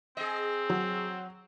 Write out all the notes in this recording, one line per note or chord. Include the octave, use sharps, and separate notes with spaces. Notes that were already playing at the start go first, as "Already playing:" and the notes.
C4 G#4 D#5
F#3